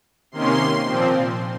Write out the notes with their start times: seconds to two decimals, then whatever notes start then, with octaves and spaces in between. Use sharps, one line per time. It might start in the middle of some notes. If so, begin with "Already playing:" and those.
0.32 C3 D#3 A#3 C#4 C6
0.85 A#2 F3 C4